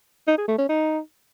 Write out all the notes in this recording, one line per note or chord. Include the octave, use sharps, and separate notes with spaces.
D#4
G#4
A3
C#4
D#4